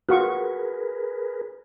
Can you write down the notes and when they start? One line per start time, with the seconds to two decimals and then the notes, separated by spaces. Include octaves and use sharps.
0.09 F4 F#4 G#4 A#4 B4 C#6